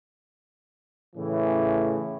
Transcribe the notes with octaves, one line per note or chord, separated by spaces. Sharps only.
A2 C#3 E3